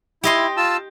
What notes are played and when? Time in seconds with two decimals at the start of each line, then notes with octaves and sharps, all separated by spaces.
0.23 E4 G4 D#5 C6
0.57 F4 A5 E6